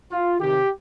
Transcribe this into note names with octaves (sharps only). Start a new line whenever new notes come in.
F4
C3 D#3 G4